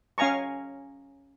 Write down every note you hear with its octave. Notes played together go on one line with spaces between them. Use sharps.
C#4 F5 G#5 A#5 C#6